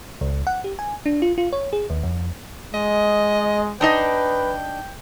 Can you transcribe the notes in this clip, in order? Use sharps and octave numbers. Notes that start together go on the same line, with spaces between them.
C#2
F#5
G4
G#5
D4
F4
F4
C#5
G#4
D#2
F2
G#3 D#5
D4 D#4 B4 D#5 G5